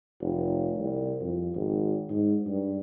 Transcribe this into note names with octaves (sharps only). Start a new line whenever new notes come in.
F1
C2
F2
G#1
G#2
G2